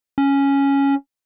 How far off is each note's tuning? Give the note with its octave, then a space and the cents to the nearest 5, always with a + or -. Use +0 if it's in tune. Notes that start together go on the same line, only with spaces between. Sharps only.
C#4 +0